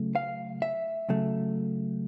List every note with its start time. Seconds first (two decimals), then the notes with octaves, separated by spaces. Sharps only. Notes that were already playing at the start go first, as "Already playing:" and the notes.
Already playing: C#3 F#3 A3
0.15 F5
0.62 E5
1.09 C#3 F#3 A3